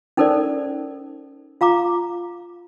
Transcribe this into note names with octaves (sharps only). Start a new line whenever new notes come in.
C#4 D#4 A4 A#4 C5 D5
F4 F5 A#5 D6